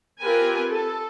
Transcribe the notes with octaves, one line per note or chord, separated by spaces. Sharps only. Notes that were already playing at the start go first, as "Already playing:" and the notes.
C4 F4 G4 A#4 B4 G#5
A4